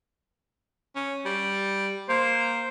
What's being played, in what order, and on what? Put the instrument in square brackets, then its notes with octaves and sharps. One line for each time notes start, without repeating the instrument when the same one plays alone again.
[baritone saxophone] C#4
G3
[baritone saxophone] A#3 [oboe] C5